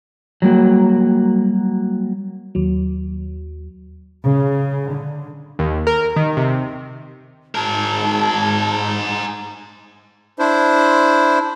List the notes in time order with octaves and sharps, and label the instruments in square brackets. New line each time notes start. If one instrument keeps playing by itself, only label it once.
[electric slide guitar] F#3 G3 A#3 F#4
[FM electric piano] D#2 F#3
[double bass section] C#3
D3
[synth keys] D#2
A#4
D#3
C3
[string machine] G#2 [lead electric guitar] G#4 A#4 [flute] A5
[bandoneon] D4 E4 C5